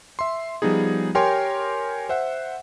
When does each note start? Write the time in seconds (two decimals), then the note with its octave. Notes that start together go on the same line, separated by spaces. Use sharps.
0.19 E5 C6
0.62 F3 G3 B3 D#4 G#4
1.15 G4 A#4 C#5 G5 G#5 C6
2.09 C5 E5 F#5